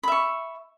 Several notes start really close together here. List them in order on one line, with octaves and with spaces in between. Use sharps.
B5 E5 C#6